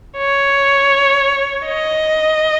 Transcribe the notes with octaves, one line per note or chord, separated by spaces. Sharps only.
C#5
D#5